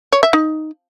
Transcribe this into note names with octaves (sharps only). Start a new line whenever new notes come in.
C#5
E5
D#4